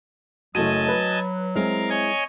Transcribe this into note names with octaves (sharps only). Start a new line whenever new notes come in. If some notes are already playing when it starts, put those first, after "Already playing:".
F#1 F#3 A3 F#4 D#5 G#5 A5 D#7
B4
G#3 C4 E4 A#4 F5
C#5 D#5 G#5